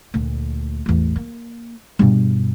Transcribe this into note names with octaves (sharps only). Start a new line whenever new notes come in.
D2 A#2
A1 E2
A#3
G2 B2